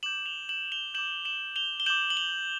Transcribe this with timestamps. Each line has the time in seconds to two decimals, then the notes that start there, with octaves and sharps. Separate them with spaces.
0.03 D6 G6 E7 F#7
0.26 F7 G7
0.49 E7 F#7
0.72 F7 G7
0.94 D6 G6 E7 F#7
1.25 E7 F#7
1.56 F7 G7
1.80 G7
1.86 D6 G6 E7 F#7
2.10 F#7
2.17 F7 G7